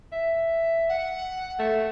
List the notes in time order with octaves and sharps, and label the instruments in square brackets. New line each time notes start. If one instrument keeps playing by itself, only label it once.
[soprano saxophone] E5
[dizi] F#5
[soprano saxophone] A3